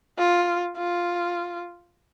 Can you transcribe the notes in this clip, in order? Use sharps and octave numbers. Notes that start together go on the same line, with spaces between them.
F4
F4